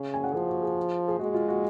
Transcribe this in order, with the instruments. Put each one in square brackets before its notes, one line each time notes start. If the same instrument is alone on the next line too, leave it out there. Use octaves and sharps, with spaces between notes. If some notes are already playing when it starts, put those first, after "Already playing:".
Already playing: [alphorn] C#3
[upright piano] G#5
F#5
[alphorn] F3 [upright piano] G#4
[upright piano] F#4
G#4
G#4
[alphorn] G#3 [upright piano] F#4
[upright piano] F4
F#4